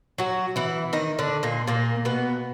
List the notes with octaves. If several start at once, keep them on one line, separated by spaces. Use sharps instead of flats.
F#3 F#4
E3 E4
D#3 D#4
D3 D4
A#2 A#3
A#2 A#3
B2 B3